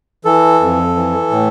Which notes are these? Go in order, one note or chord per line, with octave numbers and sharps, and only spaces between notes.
E3 A4
F2
E3
A2